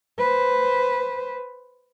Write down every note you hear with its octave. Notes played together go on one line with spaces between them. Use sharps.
B4 C5